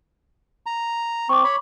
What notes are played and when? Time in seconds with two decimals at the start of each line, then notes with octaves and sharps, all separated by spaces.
0.66 A#5
1.29 C4 C#6 D6
1.44 C#5 B5